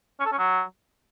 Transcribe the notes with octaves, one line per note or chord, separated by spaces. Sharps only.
C#4
A4
C#4
F#3